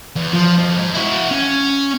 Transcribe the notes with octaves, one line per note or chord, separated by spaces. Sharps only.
E2
F3
F2
G#2
E4 F#4
C#4